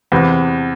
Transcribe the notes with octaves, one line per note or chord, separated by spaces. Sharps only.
E2 C3 E3